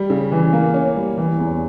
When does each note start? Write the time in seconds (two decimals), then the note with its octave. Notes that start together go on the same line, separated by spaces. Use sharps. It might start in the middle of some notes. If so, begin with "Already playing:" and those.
Already playing: G3
0.10 C#3
0.32 E3
0.53 A#3
0.74 C#4
0.96 G3
1.18 E3
1.39 E2